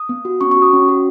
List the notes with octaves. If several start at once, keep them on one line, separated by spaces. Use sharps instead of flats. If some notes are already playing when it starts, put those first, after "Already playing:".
Already playing: D#6
B3
F#4
C#4 C#6
C#6
F#4
D#6
C#4
F#4